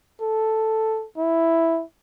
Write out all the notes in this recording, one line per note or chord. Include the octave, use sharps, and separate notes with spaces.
A4
E4